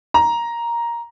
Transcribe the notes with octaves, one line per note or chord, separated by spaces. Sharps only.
A#5